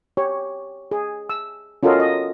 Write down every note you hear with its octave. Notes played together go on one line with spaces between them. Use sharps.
G4 C#5
G#4
E6
C#4 F4 F#4 A4 A#4 D#5
D#5